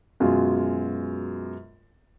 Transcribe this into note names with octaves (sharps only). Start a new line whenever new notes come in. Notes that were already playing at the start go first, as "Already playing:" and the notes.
F#2 B2 G#3 F4